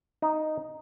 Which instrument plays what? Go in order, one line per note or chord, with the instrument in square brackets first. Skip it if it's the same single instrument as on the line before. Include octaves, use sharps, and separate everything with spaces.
[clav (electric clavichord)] D#4